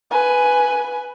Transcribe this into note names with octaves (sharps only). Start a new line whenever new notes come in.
B4 G#5